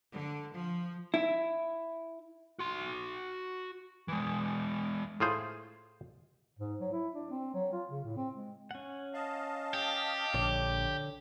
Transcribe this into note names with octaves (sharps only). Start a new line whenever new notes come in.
D3
F3
E4
F#4 C6
E3 G#3
A2 F4 G#4 C5
G#2
F#3
E4
D4
C4
F#3
F4
C#3
A2
C4
G#3
C#4 F#5
D#5 F5 A5
G4
A#1 D3 C#5 D6